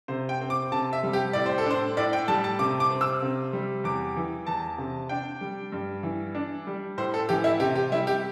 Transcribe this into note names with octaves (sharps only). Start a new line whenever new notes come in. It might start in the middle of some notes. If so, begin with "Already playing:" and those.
C3 C5
G5
C4
D6
C3 A5
E5
G3
G4
A2 D5
C5
A4
D4 C5
A2 D5
G5
G3 A5
A5
C3 D6
D6
C4
E6
C3
G3
E2 D6
E3
E2 A5
C3
D4 G5
G3
G2
E3
D4
G3
A2 C5
A4
E3 G4
E4
C3 G4
G4
G3 E4
G4